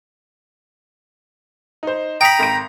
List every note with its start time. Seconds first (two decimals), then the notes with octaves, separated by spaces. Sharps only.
1.83 D#4 C5
2.21 G5 A#5 B5 D#6 C#7 F7
2.39 G#1 A#6 D7